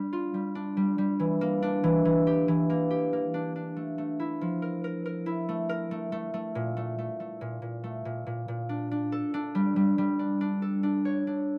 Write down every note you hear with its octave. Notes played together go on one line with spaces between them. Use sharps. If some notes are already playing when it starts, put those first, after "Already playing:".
Already playing: G3 D4
F4
G3
D4
G3
G3
E3
A#3
D4
E3
E3
G4
E3
A#3
G4
A#3
D4
D4
A3
A3
E4
F3
A#4
A#4
A#4
E4
A3
A#4
A3
A3
A3
A#2
A3
A3
A3
A#2
A#2
A3
A#2
A#2
A#2
D4
D4
A4
D4
G3
G3
G3
D4
D4
A4
D4
C#5
D4